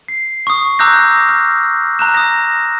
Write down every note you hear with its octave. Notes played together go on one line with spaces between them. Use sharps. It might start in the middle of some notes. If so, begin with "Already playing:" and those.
C7
C#6 D#6
A#5 D6 E6 F#6 G6 A#6
F6
A#5 F#6 E7
D#6 A#6